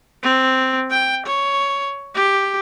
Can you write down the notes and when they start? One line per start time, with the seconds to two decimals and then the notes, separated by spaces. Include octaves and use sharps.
0.23 C4
0.91 G5
1.26 C#5
2.15 G4